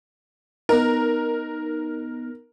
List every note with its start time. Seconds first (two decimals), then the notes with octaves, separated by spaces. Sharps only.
0.69 B3 D#4 A#4